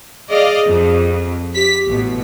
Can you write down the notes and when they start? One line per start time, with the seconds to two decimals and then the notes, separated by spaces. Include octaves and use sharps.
0.29 G#4 D5 D#5 F5
0.66 F2
1.55 G4 B6
1.87 A1 B2